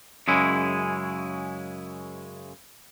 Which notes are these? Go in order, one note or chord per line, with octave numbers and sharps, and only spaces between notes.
F#2 C#3 G#3 E4